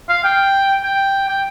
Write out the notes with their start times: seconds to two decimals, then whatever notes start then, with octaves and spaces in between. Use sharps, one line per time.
0.09 F5
0.24 G5
0.83 G5
1.29 G5